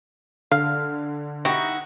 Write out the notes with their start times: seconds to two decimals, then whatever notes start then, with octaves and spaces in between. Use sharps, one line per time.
0.51 D3 F5 F6
1.45 G3 B3 D#4 E4 F#4 G5